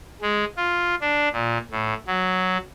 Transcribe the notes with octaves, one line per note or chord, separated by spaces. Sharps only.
G#3
F4
D4
A#2
A2
F#3